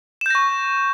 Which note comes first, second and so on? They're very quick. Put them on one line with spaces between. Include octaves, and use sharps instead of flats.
E7 G6 A#6 C#6